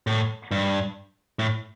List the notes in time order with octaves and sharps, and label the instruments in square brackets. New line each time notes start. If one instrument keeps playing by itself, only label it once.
[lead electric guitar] A2
G2
A2